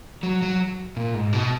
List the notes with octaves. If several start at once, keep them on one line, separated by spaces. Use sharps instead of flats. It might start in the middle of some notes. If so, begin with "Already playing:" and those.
F#3
F#3
A#2
G#2
B2